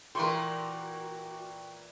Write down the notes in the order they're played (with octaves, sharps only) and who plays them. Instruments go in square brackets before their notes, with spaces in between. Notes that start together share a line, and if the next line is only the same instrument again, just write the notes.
[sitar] A#2 E3 A#4 [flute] F#4 [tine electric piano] G5 C#6 [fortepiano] C6